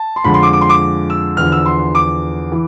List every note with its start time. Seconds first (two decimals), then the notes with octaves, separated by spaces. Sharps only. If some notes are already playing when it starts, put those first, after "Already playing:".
Already playing: A5
0.16 C6
0.24 F2 D3 G#3 B5
0.34 C6
0.43 D6
0.53 D6
0.61 C6
0.70 D6
1.10 E6
1.37 E2 D3 F3 F6
1.52 E6
1.66 C6
1.95 D6
2.52 E3